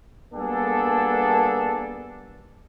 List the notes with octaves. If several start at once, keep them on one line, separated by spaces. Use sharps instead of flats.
G3 A#3 B3 D4 G#4 A4